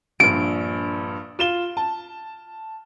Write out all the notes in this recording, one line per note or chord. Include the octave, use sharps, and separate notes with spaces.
A#1 G2 D7
F4 E7 G7
A5